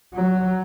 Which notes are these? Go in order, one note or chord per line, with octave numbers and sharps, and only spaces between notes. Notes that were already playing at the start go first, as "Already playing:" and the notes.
F#3